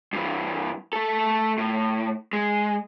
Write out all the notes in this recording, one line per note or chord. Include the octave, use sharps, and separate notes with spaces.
G2 E3
A3 A4
A2
G#3